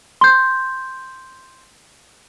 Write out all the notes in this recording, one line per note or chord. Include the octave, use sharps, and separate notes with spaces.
C6 G6